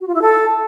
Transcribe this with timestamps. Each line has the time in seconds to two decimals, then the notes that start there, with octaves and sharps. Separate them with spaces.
0.01 F#4
0.08 F4
0.15 E4
0.22 A4